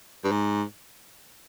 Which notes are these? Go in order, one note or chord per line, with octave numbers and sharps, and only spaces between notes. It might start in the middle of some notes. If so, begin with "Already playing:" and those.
G2
G#2